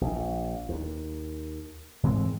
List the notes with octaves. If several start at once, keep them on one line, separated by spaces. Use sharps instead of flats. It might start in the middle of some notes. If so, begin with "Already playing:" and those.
A#1
D#2
G#2 E3 G#3 C4